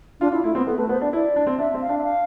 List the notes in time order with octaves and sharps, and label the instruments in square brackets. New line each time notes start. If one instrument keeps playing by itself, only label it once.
[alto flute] D4 [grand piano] F4
[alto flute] E4 [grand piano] F4
[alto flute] A3 [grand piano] E4
[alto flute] B3 [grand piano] C4
[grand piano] B3 [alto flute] A4
[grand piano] A3 [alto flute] B4
[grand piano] B3 [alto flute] C5
[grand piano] D4 [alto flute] D5
[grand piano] E4 [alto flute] D5
[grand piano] D4
C4
[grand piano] D4 [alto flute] E5
[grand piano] C4
[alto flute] F5
[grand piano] D4
[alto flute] E5
F5